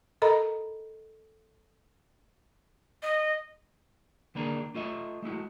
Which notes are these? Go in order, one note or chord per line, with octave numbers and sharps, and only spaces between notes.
A4 A#4 D#5 A#5 B5
D#5
D3 D#3 A#3 D4 G#4 A#4
A3 F4 D#5 E5
G#3 A3 E4 F#4